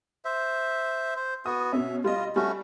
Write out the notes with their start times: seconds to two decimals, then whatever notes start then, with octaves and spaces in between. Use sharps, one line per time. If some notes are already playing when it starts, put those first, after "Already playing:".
0.25 C5 E5
1.16 C5
1.46 B3 F#4 D#6
1.73 B2 C#4 E5
2.04 G3 F4 D#5
2.36 G3 A3 C#4 F#4